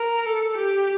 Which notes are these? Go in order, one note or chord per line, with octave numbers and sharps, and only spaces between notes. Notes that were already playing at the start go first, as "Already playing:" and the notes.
Already playing: A#4
A4
G4